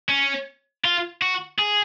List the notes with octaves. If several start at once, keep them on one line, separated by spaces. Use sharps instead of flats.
C#4
F4
F#4
G#4